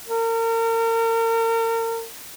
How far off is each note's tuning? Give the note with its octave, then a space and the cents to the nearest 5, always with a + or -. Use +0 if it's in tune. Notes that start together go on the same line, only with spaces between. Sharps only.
A#4 -35